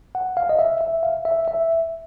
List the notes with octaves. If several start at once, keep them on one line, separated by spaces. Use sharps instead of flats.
F#5
F5
D#5
E5
E5
F5
E5
E5